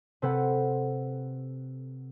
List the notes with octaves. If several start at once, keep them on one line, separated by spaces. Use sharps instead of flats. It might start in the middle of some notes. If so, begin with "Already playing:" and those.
C3 C4 A4 B4 F#5